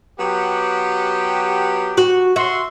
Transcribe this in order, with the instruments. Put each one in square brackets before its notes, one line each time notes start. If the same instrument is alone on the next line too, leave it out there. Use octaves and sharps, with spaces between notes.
[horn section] F#3 B3 G4
[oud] F#4
[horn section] F#4 C6 [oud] E5